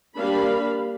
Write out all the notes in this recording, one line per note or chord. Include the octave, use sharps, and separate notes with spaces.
G3 A#3 D4 F5 B5